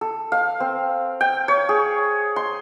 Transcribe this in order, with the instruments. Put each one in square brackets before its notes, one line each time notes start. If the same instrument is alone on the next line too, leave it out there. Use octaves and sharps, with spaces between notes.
[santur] A4
F5
C4
G5
C#5
G#4
C6